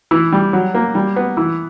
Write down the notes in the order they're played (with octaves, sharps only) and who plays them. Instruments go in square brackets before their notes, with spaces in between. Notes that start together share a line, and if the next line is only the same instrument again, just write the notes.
[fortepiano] E3
G3
F#3
A#3
G3
B3
E3